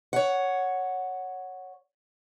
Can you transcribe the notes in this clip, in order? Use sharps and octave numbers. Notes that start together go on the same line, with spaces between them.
C#5 F#5